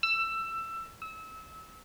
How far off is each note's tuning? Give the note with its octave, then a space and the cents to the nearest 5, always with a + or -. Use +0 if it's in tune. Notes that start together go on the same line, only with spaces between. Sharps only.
E6 +20
E6 -25